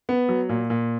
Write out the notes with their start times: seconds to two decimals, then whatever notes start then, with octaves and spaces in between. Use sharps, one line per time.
0.09 B3
0.29 F#3
0.49 A#2
0.70 A#2